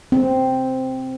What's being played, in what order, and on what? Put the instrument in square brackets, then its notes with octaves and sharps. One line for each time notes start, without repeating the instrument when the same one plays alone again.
[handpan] C4